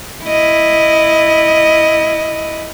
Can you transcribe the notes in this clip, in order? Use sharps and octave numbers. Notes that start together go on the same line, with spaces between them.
E4 D#5